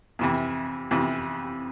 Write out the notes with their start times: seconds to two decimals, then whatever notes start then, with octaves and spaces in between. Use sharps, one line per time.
0.19 F2 C3 E3
0.91 F2 C3 E3